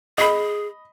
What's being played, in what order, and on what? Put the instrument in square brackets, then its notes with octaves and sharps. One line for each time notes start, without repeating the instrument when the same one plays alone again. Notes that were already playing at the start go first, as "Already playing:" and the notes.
[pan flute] G#4 [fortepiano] D#5 B5